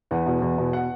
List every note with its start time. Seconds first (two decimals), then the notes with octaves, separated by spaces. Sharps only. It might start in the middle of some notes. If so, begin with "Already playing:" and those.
0.11 E2 F#5
0.26 B2
0.42 E2
0.58 B2
0.73 F#5